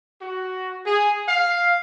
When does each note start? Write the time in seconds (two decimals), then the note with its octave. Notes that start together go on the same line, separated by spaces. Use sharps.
0.22 F#4
0.84 G#4
1.27 F5